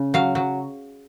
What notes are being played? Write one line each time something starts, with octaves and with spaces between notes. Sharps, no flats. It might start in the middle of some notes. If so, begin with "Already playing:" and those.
Already playing: C#3
F#3 F5
F#3